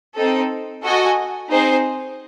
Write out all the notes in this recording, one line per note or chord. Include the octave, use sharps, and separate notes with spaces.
C4 D#4 A4
F#4 A4 D#5 G#5
C4 D#4 G#4 C5